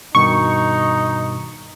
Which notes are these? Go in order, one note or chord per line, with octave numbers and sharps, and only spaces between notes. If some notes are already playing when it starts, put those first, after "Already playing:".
G2 B2 D#3 D#4 C#6